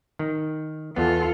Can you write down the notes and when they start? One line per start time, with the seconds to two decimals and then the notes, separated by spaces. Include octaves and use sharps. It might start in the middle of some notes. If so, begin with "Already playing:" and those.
0.19 D#3
0.96 E2 B3 F4 A4